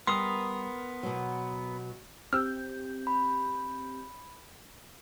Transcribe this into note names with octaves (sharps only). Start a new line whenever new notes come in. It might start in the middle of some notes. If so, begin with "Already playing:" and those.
G3 B3 A#4 C6 D#6
B2 F#3
C4 G4 E6 F6 G6
B5